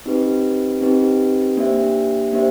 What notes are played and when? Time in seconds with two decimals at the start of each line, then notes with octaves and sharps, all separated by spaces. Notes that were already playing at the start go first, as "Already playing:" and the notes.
0.06 C4 D#4 G4 B4
0.81 C4 D#4 G4 B4
1.57 A#3 D4 G4 C5 E5
2.33 A#3 D4 G4 C5 E5